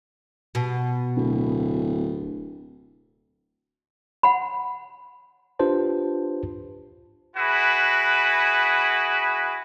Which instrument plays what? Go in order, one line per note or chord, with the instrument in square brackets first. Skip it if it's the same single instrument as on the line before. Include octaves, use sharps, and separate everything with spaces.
[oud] B2
[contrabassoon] D1
[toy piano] F#5 B5
[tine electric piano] D4 F4 G4 B4 C5 A5
[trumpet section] E4 F#4 G#4 B4